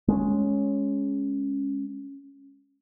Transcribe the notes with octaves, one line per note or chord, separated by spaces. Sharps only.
G#3 A3 C#4